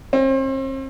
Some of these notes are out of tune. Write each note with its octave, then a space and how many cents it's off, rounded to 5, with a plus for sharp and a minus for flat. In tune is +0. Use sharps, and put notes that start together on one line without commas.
C4 +40